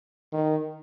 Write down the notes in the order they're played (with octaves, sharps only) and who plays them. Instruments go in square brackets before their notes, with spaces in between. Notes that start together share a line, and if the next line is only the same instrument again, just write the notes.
[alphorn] D#3